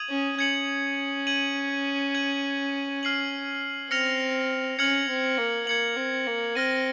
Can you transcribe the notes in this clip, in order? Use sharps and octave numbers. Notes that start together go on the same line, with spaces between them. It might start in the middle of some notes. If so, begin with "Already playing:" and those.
Already playing: D#6 G#6 D#7 F#7
C#4
C#4 G#6 C#7 F#7
G#6 D#7 F#7
G#6 D#7 F#7
F6 C7 F#7
C4 F6 A#6 C#7 F7
C#4 F6 G#6 C#7 F#7
C4
A#3
A#3 G#6 C#7 F#7
C4
A#3
C4 F6 A#6 D#7